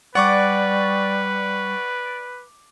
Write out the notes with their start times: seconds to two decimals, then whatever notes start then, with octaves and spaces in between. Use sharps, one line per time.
0.15 G3 B4 D5 F#5 C#6 D6